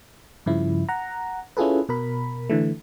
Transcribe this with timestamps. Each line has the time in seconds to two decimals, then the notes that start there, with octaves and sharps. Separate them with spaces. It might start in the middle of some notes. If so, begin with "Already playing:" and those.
0.46 G2 C#3 F3 E4
0.89 F#5 A#5
1.57 C#4 E4 F4 G#4 A4 B4
1.89 B2 A#4 B5
2.50 D3 E3 A3